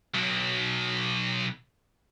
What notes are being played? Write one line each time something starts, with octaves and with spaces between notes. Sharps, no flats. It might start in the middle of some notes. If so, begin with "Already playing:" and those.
B1 B2